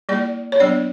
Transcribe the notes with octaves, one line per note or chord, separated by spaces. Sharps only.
G3 A#3 E4 D5
C#5
F#3 B3 D4 D5